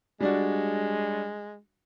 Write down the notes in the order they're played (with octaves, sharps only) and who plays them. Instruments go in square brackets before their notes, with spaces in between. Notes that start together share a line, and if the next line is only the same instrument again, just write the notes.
[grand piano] G3 D4 F#4 [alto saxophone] G#3